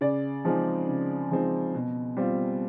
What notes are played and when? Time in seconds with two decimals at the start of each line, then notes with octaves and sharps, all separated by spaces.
0.01 C#3 D5
0.45 F3 G#3 C4 D#4
0.88 C#3
1.31 F3 G#3 C4 D#4
1.74 B2
2.17 G3 C4 F4